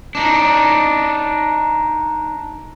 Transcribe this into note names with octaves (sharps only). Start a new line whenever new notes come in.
D4 D#4